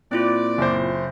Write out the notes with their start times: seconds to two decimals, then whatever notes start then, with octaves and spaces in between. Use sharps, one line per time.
0.12 A#2 C4 E4 F4 D5
0.58 F#1 C5